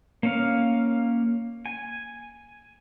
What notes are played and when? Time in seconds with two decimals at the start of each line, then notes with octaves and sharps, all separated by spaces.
0.23 A#3 C#4 F5
1.66 G#5